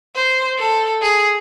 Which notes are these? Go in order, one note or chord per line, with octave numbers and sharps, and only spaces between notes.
C5
A4
G#4